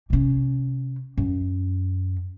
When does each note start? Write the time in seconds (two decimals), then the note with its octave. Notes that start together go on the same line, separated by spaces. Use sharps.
0.10 C3 C#4
1.17 F#2